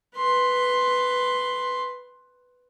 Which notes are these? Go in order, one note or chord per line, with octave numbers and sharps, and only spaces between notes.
B4 C6